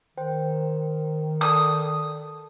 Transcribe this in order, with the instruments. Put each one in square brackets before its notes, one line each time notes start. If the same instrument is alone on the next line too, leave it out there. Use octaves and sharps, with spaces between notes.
[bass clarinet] D#3 [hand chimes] C5 G5
[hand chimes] A4 D5 A5 [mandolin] D#6